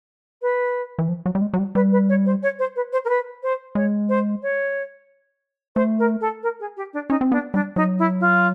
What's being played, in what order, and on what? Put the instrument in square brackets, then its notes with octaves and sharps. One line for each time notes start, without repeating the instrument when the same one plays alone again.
[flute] B4
[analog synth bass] E3
F3
F#3
G3
G#3
F#3
G3
[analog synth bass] G3 [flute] B4
[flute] B4
C#5
C5
C#5
C5
B4
C5
A#4
B4
C5
[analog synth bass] G#3 [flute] C#5
[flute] C5
C#5
[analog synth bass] A3 [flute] C5
[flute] A#4
A4
A#4
G#4
G4
D4
[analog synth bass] C#4 [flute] D#4
[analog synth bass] C4
[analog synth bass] B3 [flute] D4
[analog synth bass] G3 [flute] D4
[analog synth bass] F#3 [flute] D#4
[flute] E4
F4